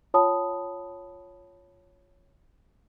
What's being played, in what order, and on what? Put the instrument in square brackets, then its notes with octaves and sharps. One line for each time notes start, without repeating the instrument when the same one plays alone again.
[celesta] F4 C#5 G5 A5 B5 D#6